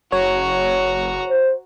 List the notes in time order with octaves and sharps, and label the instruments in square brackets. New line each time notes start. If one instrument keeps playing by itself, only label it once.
[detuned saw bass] F#1 [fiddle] F#4 A#5 [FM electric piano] C#5
[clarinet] C5